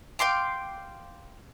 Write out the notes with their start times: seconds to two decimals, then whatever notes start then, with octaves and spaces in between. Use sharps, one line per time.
0.19 F5 G5 C6 D6